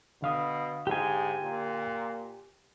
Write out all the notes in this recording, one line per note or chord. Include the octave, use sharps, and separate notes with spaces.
B2 D3 F5 D#6
G#2 G4 G#5
A#2